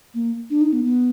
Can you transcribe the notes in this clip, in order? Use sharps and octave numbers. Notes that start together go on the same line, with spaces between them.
A#3
D4
D#4
B3
B3